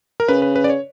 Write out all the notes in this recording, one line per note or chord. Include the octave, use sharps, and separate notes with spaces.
A#4
C#3 B4
B4
B4
D5
C#5